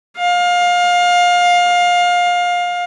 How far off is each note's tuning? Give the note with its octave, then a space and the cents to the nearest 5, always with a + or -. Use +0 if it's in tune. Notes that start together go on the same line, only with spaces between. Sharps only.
F5 +25